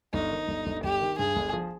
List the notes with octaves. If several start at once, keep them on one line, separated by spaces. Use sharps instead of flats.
G1 D#4
D#3
G1
G1
G1 G4
D#3
G2 G#4
G1
F3